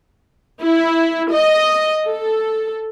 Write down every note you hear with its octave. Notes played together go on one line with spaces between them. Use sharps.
E4
D#5
A4